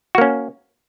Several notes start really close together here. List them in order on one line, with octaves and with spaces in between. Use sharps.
F#4 A#3 C#4